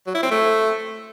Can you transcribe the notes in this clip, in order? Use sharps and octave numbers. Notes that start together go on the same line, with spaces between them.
F#3
E4
C4
A3